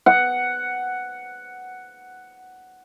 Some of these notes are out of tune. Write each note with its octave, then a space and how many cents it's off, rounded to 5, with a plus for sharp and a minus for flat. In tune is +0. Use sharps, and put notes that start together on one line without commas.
F#5 +5